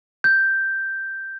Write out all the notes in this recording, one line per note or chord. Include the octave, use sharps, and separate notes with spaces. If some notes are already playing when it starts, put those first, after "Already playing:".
G6